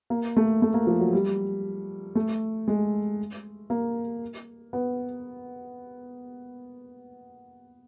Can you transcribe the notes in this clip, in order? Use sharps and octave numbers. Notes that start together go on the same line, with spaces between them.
A#3
A3
A3
A#3
F3
F#3
G3
A3
G#3
A#3
B3